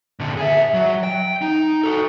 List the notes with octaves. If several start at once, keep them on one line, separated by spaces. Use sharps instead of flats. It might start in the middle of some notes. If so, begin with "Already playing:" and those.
A#2 D3
G#4 E5
F#3
G5
D#4
F#4 A4